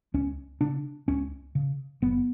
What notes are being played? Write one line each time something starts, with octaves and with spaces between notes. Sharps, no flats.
C#2 C#4
C#3 D4
C#2 C#4
C#3
F#1 B3